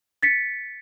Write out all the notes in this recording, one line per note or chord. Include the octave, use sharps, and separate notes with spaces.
A6 B6 C#7